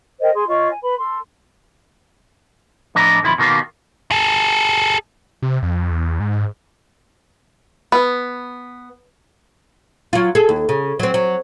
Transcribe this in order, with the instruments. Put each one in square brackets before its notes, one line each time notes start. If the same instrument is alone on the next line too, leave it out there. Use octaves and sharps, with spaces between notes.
[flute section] A#4 C5 D#5 G5
G#4 C6
F4 C#5 D#5 C#6
G#5
B4 B5
A4 C6
[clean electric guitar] A2 F3 D4 E4 D#5 A#5
B1 F2 D#3 E4 F4 B5
B2 D#3 A#3 F4 G4
[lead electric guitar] G#4 A4
[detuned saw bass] C3
F2
E2
G#2
[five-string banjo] B3 [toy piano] B4 B5
[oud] F#3 F4
G#4 A4
D#2
C#3
F#3 C4
F#3